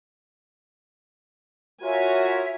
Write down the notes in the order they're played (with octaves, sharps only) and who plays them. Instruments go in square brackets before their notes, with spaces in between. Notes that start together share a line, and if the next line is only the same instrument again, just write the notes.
[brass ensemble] F4 F#4 A#4 [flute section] C#5 E5 [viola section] G#5